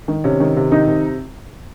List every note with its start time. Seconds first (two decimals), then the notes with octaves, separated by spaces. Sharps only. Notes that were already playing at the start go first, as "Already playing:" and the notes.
0.08 D#3
0.24 C3 C#4
0.40 D#3
0.57 C3
0.72 D#3 D#4
0.88 C3